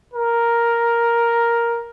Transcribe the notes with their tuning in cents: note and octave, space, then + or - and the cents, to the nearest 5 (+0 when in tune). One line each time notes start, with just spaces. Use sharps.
A#4 +5